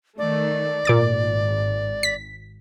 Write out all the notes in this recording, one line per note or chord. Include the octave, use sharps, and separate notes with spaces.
D#3 A3 D5
G#1 A#2 D6 A6
B6